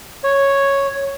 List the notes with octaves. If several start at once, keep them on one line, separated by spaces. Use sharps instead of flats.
C#5